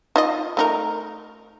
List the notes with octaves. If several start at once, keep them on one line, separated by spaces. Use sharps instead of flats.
D#4 F4 D#5
A3 D#4 A#4